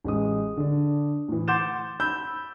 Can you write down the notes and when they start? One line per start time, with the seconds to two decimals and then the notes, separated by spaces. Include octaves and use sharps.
0.04 A1 G#3 D#6
0.57 D3 D4
1.28 A2 E3
1.48 F#5 C6 D6 G6 A6 E7
2.00 B5 E6 G6